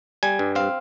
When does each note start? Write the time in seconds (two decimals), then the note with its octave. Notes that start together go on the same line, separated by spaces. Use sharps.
0.23 G3 G#5
0.39 G2
0.55 C4 F5